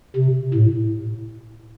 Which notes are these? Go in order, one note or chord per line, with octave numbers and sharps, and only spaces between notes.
C3
A2